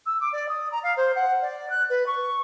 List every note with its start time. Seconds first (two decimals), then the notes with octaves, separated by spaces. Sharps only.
0.06 E6
0.20 D6
0.32 D5
0.49 D#6
0.72 A#5
0.83 F5
0.97 C5
1.15 F#5
1.42 D5
1.69 F#6
1.89 B4
2.06 C#6